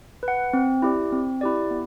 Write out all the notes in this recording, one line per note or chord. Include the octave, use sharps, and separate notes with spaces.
B4
F#5
C4
E4 G4 D5
C4
E4 G4 D5
B3